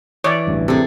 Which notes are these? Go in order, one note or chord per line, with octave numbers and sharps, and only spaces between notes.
E3 C#5 D5
A1 D2 G2
C3 G#4 A4